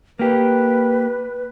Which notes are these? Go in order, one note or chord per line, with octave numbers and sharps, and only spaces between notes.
A#3 G4 B4